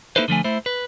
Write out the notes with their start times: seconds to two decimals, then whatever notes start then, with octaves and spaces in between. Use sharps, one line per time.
0.16 A#3 D#4 E4 A4 B4 C5
0.28 D3 F3 A3 G#5
0.44 A3 E4 C5
0.66 B4